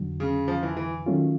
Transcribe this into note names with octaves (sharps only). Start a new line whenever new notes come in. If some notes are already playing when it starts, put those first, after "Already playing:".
Already playing: F2 D3 F#3
C#3
F3
E3
E3
D#3 F#3 A3 C#4 F4